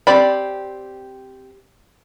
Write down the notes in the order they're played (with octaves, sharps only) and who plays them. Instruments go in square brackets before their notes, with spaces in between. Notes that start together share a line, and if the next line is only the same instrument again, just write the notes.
[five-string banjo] C4 G4 D5 B5